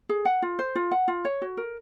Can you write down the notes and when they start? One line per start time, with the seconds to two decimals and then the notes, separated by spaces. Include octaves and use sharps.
0.09 G#4
0.25 F#5
0.42 F4
0.59 C5
0.75 F4
0.91 F#5
1.08 F4
1.25 C#5
1.42 F#4
1.57 A#4